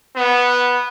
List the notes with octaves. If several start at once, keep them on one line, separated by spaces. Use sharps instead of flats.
B3